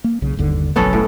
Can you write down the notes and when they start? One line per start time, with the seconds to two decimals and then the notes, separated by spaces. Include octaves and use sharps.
0.04 A#3
0.22 B1 C#3
0.37 G1 D#2 D3
0.76 F#1 B1 F#3 B3 C#4 A4
0.93 A2